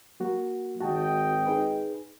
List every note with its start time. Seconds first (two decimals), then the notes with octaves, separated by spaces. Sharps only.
0.20 F#3 A#3 F#4
0.81 G#1 F#4 D#5 G5 A5
1.47 D#4 G#4 B4